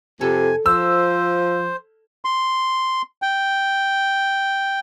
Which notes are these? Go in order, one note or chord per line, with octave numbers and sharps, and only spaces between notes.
F2 C3 A4 G#5
F3 C5 E6
C6
G5